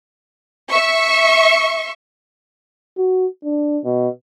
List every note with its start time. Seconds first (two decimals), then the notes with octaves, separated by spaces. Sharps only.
0.70 E5 C#6
2.97 F#4
3.44 D4
3.85 B2